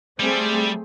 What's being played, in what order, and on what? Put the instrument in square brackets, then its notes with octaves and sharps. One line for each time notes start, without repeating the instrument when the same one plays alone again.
[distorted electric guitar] G3 [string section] A3 C4 G#4